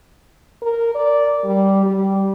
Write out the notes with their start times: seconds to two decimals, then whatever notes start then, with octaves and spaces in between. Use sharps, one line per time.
0.62 A#4
0.95 D5
1.44 G3
1.86 G3